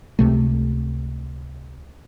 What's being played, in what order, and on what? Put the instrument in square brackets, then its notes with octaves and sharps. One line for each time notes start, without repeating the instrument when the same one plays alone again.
[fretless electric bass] C#2 C3 A3